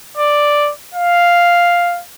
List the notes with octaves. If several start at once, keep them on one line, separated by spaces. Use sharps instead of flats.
D5
F5